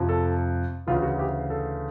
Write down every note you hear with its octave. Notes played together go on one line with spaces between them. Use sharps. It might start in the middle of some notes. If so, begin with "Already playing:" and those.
Already playing: F2 C3 F3
A4
D2 C#3 E3 F4
F#4
G4
A4